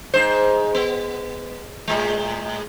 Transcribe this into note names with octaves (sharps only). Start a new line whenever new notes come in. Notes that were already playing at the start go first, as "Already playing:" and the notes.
G#2 C5
B3
A2 G#3